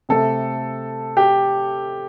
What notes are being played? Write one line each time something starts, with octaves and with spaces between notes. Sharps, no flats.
C3 A3 A4
G4